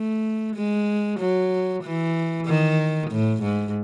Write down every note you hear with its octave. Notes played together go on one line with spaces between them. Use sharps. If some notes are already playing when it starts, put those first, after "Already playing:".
Already playing: A3
G#3
F#3
E3
D#3
A2
G#2